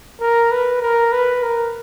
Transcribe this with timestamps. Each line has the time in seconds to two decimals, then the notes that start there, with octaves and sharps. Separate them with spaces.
0.21 A#4
0.51 B4
0.83 A#4
1.12 B4
1.43 A#4